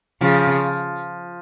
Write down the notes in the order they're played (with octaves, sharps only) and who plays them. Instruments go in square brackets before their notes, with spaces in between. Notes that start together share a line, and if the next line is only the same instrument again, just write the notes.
[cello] C#3 [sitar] F3